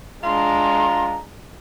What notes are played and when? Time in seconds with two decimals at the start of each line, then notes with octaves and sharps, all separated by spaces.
0.24 G#3 D4 F4 A#5 C6